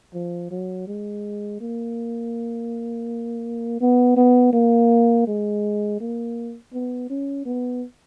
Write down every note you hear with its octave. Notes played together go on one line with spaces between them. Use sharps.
F3
F#3
G#3
A#3
B3
B3
A#3
G#3
A#3
B3
C#4
B3